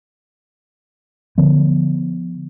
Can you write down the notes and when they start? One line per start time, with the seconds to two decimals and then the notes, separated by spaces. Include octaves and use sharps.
1.38 D3 F3 B3